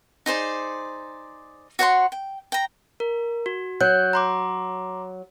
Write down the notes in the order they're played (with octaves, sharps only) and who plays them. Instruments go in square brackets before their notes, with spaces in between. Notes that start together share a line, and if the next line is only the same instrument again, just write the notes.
[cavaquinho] D#4 G#4 C5 D5
F#4 C#5 F#5 C6
G5
G5 A#5
[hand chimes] A#4
F#4
[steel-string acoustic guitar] F#3 [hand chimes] F#6 G6
[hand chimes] A#5 C6 D6